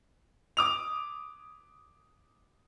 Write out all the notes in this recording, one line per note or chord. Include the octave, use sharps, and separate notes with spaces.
D6 D#6 F7